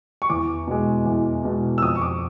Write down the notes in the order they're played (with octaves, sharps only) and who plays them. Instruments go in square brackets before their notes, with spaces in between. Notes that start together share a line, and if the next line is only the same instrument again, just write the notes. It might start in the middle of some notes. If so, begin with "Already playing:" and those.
[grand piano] C#6
E2 D6
B2 G#3
E2
B2 G#3
E6
F2 D#6
C#6
D6